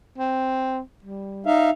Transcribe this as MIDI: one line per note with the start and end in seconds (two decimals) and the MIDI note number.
0.18 0.80 60
1.04 1.46 55
1.46 1.70 63
1.46 1.70 76
1.46 1.70 77